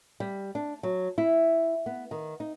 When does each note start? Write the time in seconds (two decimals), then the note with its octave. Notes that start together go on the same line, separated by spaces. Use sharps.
0.20 G3
0.55 D4
0.83 F#3
1.18 E4
1.86 B3
2.11 D#3
2.40 D#4